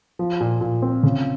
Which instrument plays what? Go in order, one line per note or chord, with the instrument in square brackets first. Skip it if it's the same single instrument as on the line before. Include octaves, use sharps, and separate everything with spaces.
[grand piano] F3
A#2
A#2
C4
C#3